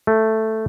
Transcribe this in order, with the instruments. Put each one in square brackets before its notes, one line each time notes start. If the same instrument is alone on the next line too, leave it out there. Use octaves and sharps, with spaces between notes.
[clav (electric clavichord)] A3